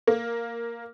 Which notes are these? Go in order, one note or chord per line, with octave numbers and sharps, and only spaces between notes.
A#3